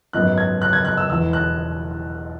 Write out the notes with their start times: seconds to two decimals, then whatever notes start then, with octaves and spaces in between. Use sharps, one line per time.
0.13 G#1 F#2 F#3 B3 F#6
0.38 G#6
0.62 F#6
0.73 G#6
0.85 F#6
0.97 E6
1.09 E1 E2 E3 E6
1.33 F#6